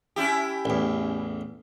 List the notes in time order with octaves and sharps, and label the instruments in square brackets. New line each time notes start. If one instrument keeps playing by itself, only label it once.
[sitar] C#4 E4 G4
[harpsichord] A1 E2